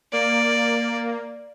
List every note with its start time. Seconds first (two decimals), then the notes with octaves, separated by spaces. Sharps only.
0.13 A#3 D5